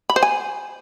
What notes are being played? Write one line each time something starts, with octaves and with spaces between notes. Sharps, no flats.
B5
C5
G#5